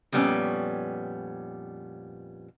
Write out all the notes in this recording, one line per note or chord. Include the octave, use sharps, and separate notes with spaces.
F2 A#2 G3 B3 C#4